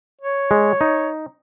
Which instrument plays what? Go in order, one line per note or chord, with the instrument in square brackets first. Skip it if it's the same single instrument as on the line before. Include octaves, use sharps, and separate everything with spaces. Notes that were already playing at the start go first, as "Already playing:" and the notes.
[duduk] C#5
[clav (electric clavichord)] G#3
D#4